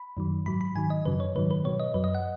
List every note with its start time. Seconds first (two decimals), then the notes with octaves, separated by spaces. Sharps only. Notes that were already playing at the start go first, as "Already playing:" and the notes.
Already playing: B5
0.17 F#2 D#3 F#3
0.46 G#2 F#3 B5
0.61 B5
0.75 G#2 D#3 F#3 G#5
0.90 D#5
1.05 F#2 C#3 F#3 B4
1.20 C#5
1.36 G#2 D#3 F#3 B4
1.51 B4
1.64 B2 F#3 C#5
1.80 D#5
1.94 F#2 F#3 B4
2.04 D#5
2.15 F#5